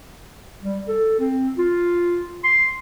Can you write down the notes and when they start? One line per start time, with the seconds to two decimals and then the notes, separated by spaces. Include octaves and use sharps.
0.63 G3
0.88 A4
1.20 C4
1.58 F4
2.44 C6